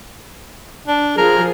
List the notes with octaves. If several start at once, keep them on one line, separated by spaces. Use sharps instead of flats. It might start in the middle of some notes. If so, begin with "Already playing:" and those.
D4
F3 G#4 A#4